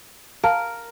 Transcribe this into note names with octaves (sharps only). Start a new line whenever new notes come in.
A#4 F5 A5 A#5